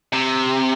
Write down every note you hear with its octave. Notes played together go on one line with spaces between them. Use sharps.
C3